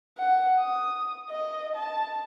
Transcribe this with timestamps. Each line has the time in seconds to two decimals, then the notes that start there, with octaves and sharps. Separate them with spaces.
0.18 F#5
0.60 D#6
1.30 D#5
1.76 A5